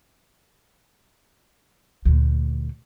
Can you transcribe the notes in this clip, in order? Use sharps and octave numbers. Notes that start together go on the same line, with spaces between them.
D2 A#2